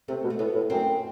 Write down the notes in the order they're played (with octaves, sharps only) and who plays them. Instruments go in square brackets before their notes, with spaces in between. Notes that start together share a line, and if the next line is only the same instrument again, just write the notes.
[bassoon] C3 [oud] A3
[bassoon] B2
[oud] A3
[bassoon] A2 [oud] B3
[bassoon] A2
[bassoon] F#2 [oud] C4